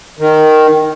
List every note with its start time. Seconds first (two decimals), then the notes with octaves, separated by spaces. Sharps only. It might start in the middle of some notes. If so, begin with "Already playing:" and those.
0.19 D#3